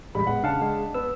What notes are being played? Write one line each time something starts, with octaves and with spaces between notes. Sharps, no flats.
A1 G3 G#3 B5 B6
A2 G#3 B3 F#5
C#3 D4 F5 F#5 A5
G#3
B3 E6